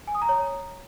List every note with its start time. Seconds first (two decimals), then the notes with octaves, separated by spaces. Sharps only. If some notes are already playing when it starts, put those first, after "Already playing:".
0.08 G#5
0.15 D#6
0.22 A#5
0.29 C#5